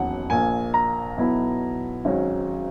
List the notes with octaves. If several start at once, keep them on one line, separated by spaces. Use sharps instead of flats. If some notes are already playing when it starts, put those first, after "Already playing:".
Already playing: E1 D#2 D#3 F#3 C#4 F#5
A#1 A#2 A#3 G#5
A#5
B1 B2 F#3 B3 E4
G#1 G#2 F#3 C#4